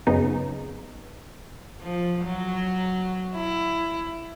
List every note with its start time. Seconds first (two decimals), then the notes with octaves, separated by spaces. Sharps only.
0.07 F#2 C#3 B3 D#4
1.81 F3
2.24 F#3
3.35 E4